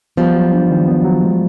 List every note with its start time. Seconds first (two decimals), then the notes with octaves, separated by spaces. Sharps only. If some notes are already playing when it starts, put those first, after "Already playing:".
0.17 F3 G3 B3
0.35 F#3
0.53 D4
0.71 D#3
0.88 B3
1.04 F#3
1.23 G#3